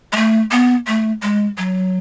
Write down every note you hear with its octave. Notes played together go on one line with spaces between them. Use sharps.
G#3
A3
B3
A3
G#3
F#3